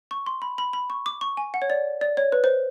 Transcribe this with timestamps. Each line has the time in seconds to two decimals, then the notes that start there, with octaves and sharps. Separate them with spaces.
0.11 C#6
0.26 C6
0.42 B5
0.58 B5
0.73 B5
0.90 C#6
1.06 D6
1.21 C#6
1.37 G#5
1.54 F#5
1.62 C#5
1.70 D5
2.01 D5
2.17 C#5
2.32 B4
2.44 C5